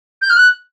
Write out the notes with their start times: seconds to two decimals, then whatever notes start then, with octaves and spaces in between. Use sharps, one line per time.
0.22 G6
0.30 F6
0.36 F#6